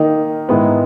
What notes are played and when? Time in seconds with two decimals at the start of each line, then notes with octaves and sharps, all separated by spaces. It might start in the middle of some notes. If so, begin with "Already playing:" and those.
Already playing: D#3 A#3 D#4
0.49 G#2 D#3 G#3 B3 E4